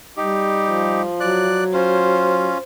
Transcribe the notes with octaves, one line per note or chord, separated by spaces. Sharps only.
G3 D#4 G4
F3
F#3 D5 F#6
C#4 F4 C5